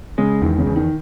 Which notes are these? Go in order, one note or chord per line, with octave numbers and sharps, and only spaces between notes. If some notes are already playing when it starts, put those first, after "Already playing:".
C#3 G#3
E2 D#3
C#3
E2
D#3